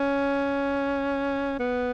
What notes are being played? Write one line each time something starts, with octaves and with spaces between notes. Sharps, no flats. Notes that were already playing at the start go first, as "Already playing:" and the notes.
Already playing: C#4
B3